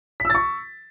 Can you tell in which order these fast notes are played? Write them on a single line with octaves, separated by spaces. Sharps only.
B6 E6 A6 C#6